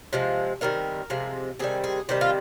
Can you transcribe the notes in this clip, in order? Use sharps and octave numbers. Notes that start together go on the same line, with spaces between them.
C3 F3 G#3
C3 D#3 G3 A#4
C3 F3 G#3
C3 D#3 G3 G#4
G#4
C3 D#3 G3 G4
F4